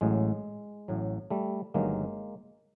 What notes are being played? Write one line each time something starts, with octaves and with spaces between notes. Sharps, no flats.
A1 A2 F#3 G#3
A1 A2 F#3
G3 A3
G1 G2 D#3 F#3 G#3 A#3